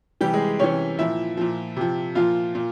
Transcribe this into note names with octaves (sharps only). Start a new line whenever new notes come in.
C3 E3 G3 G4
G#3 G#4
C3 E3 C#4 C#5
A#2 F3 E4 E5
A#2 F3
C3 F3
A#2 F3 F4 F5
A#2